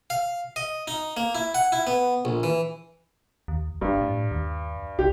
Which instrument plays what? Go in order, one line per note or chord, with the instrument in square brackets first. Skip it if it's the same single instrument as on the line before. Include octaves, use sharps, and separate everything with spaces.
[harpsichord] F5
D#5
D#4
A#3
E4
F#5
E4
B3
A#1
E3
[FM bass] D#2
[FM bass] F#1 [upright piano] G2
[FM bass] A2
D#2
[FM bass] C2 [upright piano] G4